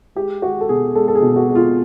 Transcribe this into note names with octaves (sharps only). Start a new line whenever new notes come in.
G#3 G4
G#3 F#4
A4
B2 G#4
G#3 A4
A4
G#4
B2
F#4
G#3
F4